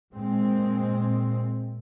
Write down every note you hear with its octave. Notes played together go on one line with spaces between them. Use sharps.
A#2 G#3 C4